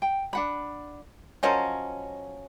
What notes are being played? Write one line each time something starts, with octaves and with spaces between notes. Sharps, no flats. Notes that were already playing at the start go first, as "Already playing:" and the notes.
G5
D4 F#5 B5
F3 F#3 C#4 A#4 D#5 F5